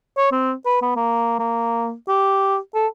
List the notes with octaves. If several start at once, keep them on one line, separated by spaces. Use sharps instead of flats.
C#5
C4
B4
B3
A#3
A#3
G4
A4